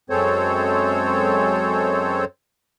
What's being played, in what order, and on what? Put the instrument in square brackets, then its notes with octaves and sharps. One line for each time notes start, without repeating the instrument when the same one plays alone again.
[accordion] F#2 G#3 C4 A4 C5 C#5